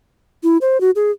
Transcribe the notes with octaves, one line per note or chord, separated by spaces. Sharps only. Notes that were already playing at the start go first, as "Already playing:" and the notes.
E4
C5
F#4
G#4